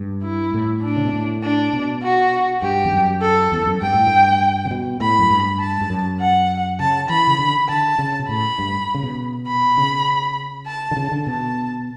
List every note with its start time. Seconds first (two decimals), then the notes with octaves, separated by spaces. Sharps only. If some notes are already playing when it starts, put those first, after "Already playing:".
Already playing: G2
0.23 E4
0.54 A2
0.83 D4
0.96 C#3
1.05 B2
1.13 A2
1.43 D4
1.73 B2
2.03 F#4
2.62 G2 G4
2.85 E2
2.92 F#2
3.21 A4
3.52 E2
3.66 F#2
3.82 G2 G5
3.94 A2
4.06 G2
4.65 C#3
4.71 B2
5.01 A2 B5
5.19 F#2
5.30 G2
5.60 A5
5.81 G2
5.90 F#2
6.20 F#5
6.80 C#3 A5
7.09 E3 B5
7.27 C#3
7.39 D3
7.68 D3 A5
7.99 C#3
8.19 B2
8.29 A2 B5
8.59 G2
8.95 C#3
9.03 B2
9.47 B5
9.78 C#3
10.67 A5
10.91 D3
10.97 C#3
11.12 D3
11.26 B2 A5